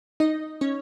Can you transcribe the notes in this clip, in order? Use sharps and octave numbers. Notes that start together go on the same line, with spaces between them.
D#4 D#5
C#4 C#5